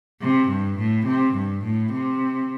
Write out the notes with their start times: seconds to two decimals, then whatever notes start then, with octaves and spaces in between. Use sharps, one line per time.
0.21 C3
0.49 G2
0.78 A2
1.06 C3
1.35 G2
1.64 A2
1.93 C3